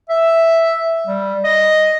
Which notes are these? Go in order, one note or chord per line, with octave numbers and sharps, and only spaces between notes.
E5
G3
D#5